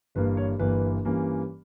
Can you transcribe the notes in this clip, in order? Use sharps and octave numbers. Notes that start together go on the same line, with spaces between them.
G1 G2 E3 A#3 B4
C#5
G1 G2 E3 A#3 B4
G2 E3 G3 A#3 C#4